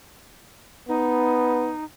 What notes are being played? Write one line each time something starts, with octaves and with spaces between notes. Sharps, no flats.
B3 D#4